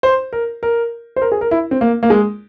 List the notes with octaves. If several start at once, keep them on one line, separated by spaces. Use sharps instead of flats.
C5
A#4
A#4
C5
A#4
G#4
A#4
E4
C4
A#3
A#3
G#3